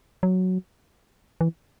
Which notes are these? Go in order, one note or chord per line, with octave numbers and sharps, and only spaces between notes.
F#3
E3